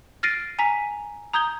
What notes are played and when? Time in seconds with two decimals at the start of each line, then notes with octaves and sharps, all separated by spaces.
0.23 F6 A6 A#6 C7 D7 D#7
0.59 G#5 A#5 B6
1.34 A#5 D#6 G6 G#6 G7